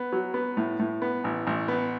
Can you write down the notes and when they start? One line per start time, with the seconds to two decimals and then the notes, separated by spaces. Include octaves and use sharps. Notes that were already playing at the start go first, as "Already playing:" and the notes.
Already playing: B3
0.12 F#3
0.34 B3
0.57 A2
0.79 A2
1.02 B3
1.24 A1
1.47 A1
1.68 B3